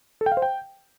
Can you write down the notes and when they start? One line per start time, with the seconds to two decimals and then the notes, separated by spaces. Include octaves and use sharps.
0.21 A4
0.26 G5
0.32 F5
0.37 C5
0.42 G5